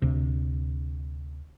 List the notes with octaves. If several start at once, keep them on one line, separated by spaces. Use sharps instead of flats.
D2 C3